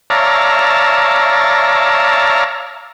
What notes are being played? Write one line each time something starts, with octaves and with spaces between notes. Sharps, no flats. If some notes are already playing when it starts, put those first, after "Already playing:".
C#5 D5 E5 F5 A5 A#5